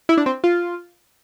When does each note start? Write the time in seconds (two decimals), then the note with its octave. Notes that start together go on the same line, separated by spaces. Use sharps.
0.09 E4
0.17 D4
0.26 C4
0.44 F4